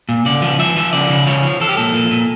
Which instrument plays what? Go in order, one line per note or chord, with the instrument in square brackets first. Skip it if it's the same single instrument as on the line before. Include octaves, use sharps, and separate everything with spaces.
[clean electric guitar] A#2
C#3 D5
F3
F3 E5
F3
C#3 D5
C#3
F3 C#5
F3
F3 A4
G4
A#2 A4
A#2
A#2